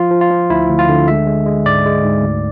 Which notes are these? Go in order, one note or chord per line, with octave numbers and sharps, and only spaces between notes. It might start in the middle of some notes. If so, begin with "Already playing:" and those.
Already playing: F3 F4
F3
F4
F3
D2 E4
D2
F4
D3
G#3 E5
G#3
G#3
G#2 D5
G#3
G#2
D2